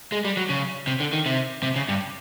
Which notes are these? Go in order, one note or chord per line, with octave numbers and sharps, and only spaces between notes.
G#3
G3
F#3
C#3
C3
D3
D#3
C3
C3
C#3
G2